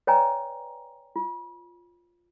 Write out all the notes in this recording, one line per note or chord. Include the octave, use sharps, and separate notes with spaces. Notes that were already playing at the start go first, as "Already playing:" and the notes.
B4 C#5 D5 G5 G#5 A#5
F4